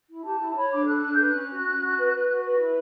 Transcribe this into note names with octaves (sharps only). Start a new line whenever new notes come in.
E4
G4 A5
E4
A5
C#5 B5
D4 D6
A4 F#6
D4 F#6
B4 G6
F#6
C#4
F#4
C#4
F#4
B4
B4
F#4
B4
E4